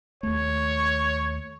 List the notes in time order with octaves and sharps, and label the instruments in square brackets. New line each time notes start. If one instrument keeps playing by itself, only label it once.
[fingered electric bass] D#2 A3 [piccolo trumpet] C#5